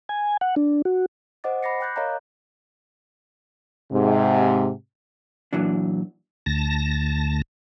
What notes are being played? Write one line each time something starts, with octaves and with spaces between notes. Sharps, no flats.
G#5
F#5
D4
F#4
C5 D#5 F#5 D6 A6
B5 D6 A6 A#6 C7 C#7
G5 D6 F#6 G6 A6
A#4 C#5 D#5 F5 G5 A#5
G#2 C3
A#2 E3 F#3 D4
D2 A5 A#6